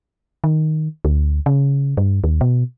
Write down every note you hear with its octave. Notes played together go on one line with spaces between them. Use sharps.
D#3
D2
C#3
G2
D#2
B2